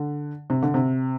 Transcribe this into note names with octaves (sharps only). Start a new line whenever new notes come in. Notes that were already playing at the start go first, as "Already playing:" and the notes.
Already playing: D3
C3
D3
C3